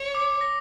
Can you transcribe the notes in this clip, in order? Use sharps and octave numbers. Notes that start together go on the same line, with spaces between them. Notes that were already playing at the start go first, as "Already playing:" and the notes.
Already playing: C#5
D6
A#6